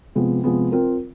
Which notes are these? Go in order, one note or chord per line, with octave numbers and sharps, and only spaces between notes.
C3 F3 G#3 B3
C3 F3 G#3 B3
C4 F4 A#4